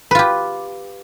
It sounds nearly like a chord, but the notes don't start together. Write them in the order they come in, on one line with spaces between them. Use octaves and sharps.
B4 F4 G4